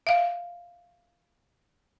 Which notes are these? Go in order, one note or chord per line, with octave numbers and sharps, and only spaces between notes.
E5 F5